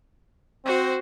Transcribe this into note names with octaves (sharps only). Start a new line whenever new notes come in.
C4 F#4 C5